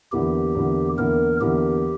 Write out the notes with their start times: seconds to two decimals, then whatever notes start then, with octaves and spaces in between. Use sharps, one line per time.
0.12 E2 D3 A#3 E4 G4
0.55 E2 D3 A#3 E4
0.98 E2 D3 A#3 E4 A#4
1.41 E2 D3 A#3 E4 G4